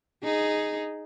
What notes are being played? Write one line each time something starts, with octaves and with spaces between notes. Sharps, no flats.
D#4 G#4